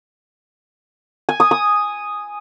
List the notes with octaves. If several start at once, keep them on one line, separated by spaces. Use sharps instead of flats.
G#5
D#6
D#6